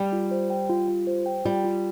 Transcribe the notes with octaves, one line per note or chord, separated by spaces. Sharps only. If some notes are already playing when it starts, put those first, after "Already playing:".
Already playing: G3
F4
C5
G5
F4
F4
C5
G5
G3 F4
F4